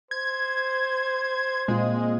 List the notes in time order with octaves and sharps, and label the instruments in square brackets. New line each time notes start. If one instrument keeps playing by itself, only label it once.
[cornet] C5 [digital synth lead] G#6
[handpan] A#2 C4 F4 [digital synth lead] G#3